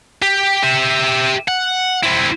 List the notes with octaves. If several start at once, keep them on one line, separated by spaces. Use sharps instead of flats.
G4
G4 E5
F#5
C4 E4